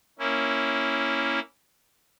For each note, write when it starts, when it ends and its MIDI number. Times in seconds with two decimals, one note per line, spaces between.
0.19 1.40 58
0.19 1.40 61
0.19 1.40 64